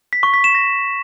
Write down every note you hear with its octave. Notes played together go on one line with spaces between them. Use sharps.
B6
C#6
B6
E7
A#6